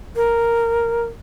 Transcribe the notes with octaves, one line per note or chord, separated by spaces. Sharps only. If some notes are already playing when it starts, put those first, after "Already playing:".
A#4